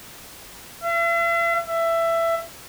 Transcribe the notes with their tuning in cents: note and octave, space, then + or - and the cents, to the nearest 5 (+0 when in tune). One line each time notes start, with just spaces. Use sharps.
E5 +45
E5 +15